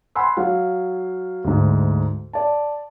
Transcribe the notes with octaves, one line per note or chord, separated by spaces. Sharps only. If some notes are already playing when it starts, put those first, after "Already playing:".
F#5 G#5 B5 C6 E6
F#3 F5
D2 G#2
D5 A5